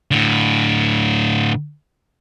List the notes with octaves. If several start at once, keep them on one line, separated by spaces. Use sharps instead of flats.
A2 D3